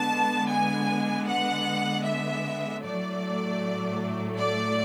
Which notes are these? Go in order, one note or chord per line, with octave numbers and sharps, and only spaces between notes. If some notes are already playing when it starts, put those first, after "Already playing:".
Already playing: D3 G#3 B3 A5
G#5
F#5
E5
A2 F#3 A3 D5
D5